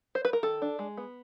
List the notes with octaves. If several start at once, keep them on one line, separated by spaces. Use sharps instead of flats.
C5
B4
A#4
D#3 A4
D4
G#3
B3